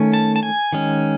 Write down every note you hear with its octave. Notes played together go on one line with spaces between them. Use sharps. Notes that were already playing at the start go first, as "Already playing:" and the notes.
Already playing: D#3 A3 C#4
A5
A5
G#5
D#3 G#3 C#4